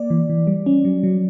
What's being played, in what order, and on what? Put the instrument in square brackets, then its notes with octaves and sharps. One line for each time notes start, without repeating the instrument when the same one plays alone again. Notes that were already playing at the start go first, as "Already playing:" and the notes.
Already playing: [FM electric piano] A#3 D5
E3
E3
G3
C#4
F#3
F#3